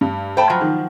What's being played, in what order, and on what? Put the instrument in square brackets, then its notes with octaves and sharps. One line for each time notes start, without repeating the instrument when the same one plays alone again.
[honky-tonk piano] G2
[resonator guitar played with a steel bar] A3 G5 A5 [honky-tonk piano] C5 B5
[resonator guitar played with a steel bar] F3 F#3
[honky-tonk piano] D#3